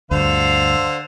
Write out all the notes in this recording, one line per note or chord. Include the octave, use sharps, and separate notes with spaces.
D2 G2 D3 C5 F5